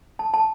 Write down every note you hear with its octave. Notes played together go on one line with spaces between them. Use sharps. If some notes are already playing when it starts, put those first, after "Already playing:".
A5
A5